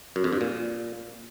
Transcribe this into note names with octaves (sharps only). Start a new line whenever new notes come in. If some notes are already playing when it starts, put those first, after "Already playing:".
F#2
F2
G2
A#2